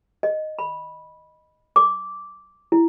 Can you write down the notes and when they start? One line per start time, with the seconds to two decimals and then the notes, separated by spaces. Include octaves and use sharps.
0.23 D#5
0.59 B5
1.76 D6
2.72 E4